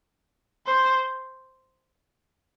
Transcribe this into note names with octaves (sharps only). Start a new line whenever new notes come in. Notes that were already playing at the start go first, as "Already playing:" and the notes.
C5